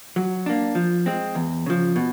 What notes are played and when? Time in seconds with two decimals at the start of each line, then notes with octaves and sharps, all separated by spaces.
0.16 F#3
0.46 A#3 D4
0.75 F3
1.06 G#3 C4
1.35 E2
1.66 C#3 F3
1.96 B2